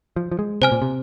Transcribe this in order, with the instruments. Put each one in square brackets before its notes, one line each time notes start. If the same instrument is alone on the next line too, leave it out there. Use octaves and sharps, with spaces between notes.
[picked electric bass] F3
F3
G#3
[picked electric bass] C3 [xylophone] C5 G#5 F6
[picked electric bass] A#2
C3